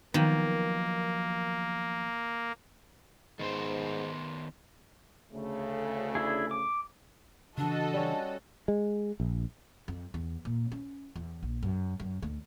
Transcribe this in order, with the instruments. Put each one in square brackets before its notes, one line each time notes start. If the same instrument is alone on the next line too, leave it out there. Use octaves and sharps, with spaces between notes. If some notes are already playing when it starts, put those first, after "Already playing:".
[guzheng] D#3 [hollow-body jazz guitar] F3 F#3 B3 [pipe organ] A#3
[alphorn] G#2 [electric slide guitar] D#3 B3 C5
[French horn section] D2 C#3 A3
[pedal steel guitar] D4 E4 G#4
D6
[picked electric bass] C#3 E3 [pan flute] D4 [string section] F#4 A4 D#5
[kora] G3 C#4
[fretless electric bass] G#3
A#1
[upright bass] F2
E2
A#2
C#4
E2
A#1
F#2
F#2
D2